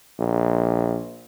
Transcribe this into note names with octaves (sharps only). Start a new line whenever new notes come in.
A#1